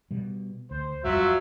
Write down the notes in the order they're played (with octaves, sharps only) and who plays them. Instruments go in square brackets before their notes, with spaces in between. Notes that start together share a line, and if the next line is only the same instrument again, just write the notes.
[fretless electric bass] B2 G3
[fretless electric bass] D2 [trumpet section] C5
[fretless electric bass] D1 F2 G3 [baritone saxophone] F#3 [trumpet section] F4 E5